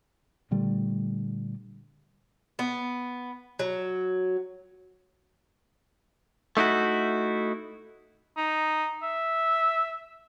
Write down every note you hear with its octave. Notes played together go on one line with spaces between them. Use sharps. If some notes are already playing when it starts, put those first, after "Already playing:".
A#2 D3 G3 A3
B3
F#3
A3 D#4 E4 F#4
D#4
E5